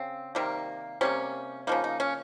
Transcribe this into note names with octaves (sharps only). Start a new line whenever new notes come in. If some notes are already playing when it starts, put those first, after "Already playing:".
Already playing: C#3 C4
C3 D#3 G3 A#3
C3 G3 A#3 C#4
C#3 F3 A#3 D#4
D#4
C#4